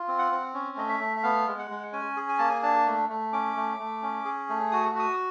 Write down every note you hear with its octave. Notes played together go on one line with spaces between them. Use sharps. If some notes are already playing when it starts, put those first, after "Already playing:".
Already playing: F4
C4
F#5
C4
C#4
A3 D#5
E5
A3
E5
B3 F5
G#3
F#5
G#3
C#4 G#5
G#4
G#5
A#3 A5
G#5
D4 A5
A3
A3
C#4 D6
A3
A3
C#4
G#4
A3
F#4 D#6
F#4 D#6